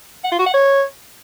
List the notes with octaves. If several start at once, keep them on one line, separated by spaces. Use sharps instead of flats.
F#5
F4
F#4
F#5
C#5